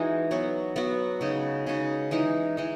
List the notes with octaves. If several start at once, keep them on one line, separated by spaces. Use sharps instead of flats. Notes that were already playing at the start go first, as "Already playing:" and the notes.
Already playing: E3 G#3 D#4 F#4
F#3 B3 F#4
F#3 B3 F#4
C#3 G#3 D#4 F#4
C#3 G#3 D#4 F#4
E3 G#3 D#4
E3 G#3 D#4